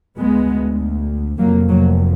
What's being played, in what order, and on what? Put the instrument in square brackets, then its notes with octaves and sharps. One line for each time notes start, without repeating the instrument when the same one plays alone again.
[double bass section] D2 G#3 B3
F1 F2 F#3 A#3
F#3 A#3